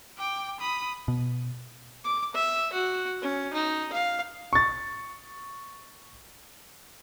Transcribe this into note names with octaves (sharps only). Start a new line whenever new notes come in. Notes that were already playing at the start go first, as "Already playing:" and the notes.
G5 D6
B5 D#6
B2
D6
E5
F#4
C#4
D#4
F5
C#6 A6